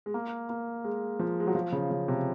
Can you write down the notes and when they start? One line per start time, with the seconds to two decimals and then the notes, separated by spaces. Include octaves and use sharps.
0.06 G#3
0.14 A#3
0.49 A#3
0.84 G#3
1.19 F3
1.40 G#3
1.47 F#3
1.55 F3
1.72 C#3
1.91 C#3
2.08 C3